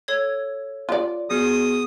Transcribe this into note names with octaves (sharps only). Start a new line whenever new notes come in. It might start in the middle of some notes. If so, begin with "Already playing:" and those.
A4 C#5 G#6
F4 D5
B3 F#4 G#4 D#6